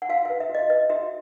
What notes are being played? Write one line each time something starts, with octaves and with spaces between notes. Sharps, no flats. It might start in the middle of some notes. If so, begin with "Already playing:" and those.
F#5
F#4 F5
B4 F5
E5
F#4
D#5
B4 D#5
F#4 E5